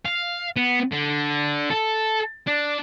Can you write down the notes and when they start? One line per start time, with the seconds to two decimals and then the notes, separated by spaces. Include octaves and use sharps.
0.05 F5
0.56 B3
0.92 D3
1.70 A4
2.47 D4